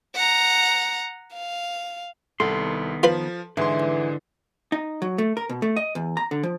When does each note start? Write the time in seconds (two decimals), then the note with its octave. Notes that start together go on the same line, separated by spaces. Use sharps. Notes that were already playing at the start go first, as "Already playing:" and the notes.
0.15 F#5 A#5
1.34 F5
2.40 C2 D#3 B3 A4 C6
3.03 F3 F4 B4 B5
3.57 G#2 D3 E3 G#4 C6
4.72 D#4
5.02 F#3
5.18 A3
5.37 A#4
5.49 B2
5.62 A3
5.76 D#5
5.95 E2
6.17 A#5
6.31 D3
6.43 F3